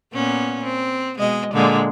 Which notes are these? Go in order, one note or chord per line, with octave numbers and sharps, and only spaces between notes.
A#2 B3 C#4
C4
B2 G#3 D#5
A#2 D3 G#3